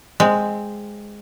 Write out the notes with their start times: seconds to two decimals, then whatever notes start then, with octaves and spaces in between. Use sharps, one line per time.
0.20 G#3 C4